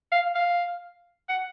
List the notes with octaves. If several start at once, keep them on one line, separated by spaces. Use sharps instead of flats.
F5
F5
F#5